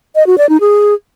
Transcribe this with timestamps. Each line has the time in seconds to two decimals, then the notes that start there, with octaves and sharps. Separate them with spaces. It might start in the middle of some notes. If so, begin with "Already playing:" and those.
0.15 D#5
0.27 F#4
0.38 D5
0.49 D#4
0.61 G#4